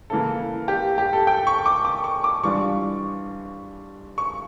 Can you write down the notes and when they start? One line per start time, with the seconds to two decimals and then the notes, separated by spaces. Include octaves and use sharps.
0.10 C#3 E3 A#3 A4
0.68 G4
0.98 G4
1.13 A4
1.27 G5
1.47 C#6
1.66 D6
1.85 D6
2.04 C#6
2.24 D6
2.43 E3 G3 D4 F4 C#6
4.18 C#6